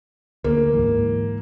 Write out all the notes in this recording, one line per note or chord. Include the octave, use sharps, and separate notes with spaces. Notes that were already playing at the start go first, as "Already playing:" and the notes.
D2 A#3
G#2 E3